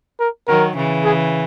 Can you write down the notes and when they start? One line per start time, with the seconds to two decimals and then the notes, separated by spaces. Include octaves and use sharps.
0.20 A#4
0.48 D#3 F#3 A#4
0.76 C#3 E3
1.04 G#4